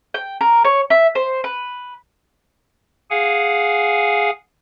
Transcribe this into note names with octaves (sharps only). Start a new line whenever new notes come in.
G5
A#4
C#5
E5
C5
B4
G#4 F5 F#5 G#5